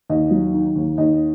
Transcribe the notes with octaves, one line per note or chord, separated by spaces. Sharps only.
D#2 D#5
F#3
D#3
D#2
D#2 D#5